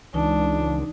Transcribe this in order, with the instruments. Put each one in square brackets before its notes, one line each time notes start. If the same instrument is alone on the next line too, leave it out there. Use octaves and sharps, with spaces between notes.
[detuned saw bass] C#2 [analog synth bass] E3 [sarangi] D4 [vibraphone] D#4